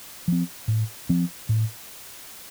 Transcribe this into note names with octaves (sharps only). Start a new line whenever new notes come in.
F3 C4
A2
F3 C4
A2